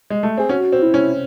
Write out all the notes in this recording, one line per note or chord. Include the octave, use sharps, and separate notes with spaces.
G#3
A3
C4 G#4
C#4 F#4
C4
E4
C#4